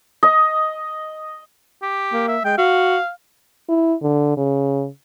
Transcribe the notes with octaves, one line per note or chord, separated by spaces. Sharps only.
D#5
G4
A#3
E5
G#3 G5
F#4 F5
E4
D3
C#3